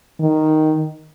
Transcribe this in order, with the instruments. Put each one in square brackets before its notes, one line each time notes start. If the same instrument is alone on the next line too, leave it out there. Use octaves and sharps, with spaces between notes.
[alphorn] D#3